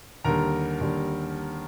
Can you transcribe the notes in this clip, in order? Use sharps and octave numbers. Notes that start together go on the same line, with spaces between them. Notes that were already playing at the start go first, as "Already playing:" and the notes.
D#2 D3 G3 A#4 A#5
D#2 D3 G3